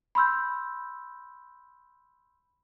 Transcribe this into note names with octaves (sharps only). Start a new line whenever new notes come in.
B5 C6 E6 G6